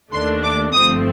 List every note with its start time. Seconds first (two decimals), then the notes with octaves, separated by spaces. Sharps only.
0.11 D#2 D#3 A3 D4 C6
0.43 D6
0.73 G1 G2 F3 A3 C4 D#6